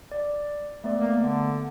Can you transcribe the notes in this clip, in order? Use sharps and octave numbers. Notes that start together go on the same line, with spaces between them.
D5
A3 B3 D5
A#3
D3